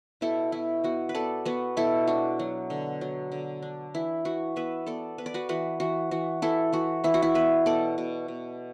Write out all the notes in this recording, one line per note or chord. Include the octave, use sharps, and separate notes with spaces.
B2 E4 A4
B2 E4
B3 F#4
B4
B3 A4 D5
B3 F#4 B4
B2 E4 A4
D4 F#4
F#3
D3
F#3
D3
D4
E3 E4
E3 F#4
B3 B4 E5
B3 A4 D5
B3 B4
D5
F#4 B4
E3 F#4 B4
E3 F#4
E3 F#4
E3 E4 A4
E3 F#4
E3 E4
F#4
E4
B3 B4 E5
B2 A4 D5
B2
B2